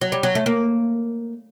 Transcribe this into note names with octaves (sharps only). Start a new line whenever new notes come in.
F#3
G3
F#3
A3
A#3